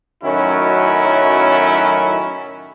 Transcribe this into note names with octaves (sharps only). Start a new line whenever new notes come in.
F#2 A2 D#3 F#3 C#4 E4